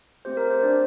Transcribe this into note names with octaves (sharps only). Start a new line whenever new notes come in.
A3 C4 G4 C5
A#4
C5
D4 D5